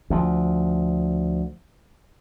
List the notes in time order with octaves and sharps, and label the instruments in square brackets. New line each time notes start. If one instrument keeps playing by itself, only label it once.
[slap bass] D2 F3